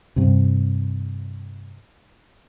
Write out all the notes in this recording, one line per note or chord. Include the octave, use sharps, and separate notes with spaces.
G2 C3